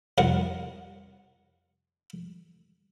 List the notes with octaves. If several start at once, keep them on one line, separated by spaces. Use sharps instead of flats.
C2 F2 A#4 F#5